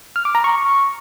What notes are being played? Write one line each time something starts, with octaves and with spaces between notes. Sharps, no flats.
F6
D6
A#5
C#6